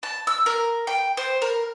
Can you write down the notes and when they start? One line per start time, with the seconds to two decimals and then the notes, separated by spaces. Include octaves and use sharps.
0.03 A5
0.27 E6
0.46 A#4
0.87 G5
1.17 C5
1.42 A#4